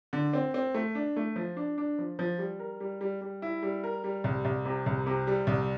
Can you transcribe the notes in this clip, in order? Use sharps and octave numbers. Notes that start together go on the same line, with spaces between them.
D3
C4
C4
A3
D4
A3
F3
D4
D4
F3
F3
G3
A#4
G3
G3
G3
E4
G3
A#4
G3
C2
C2
C3
C2
C3
G3
C2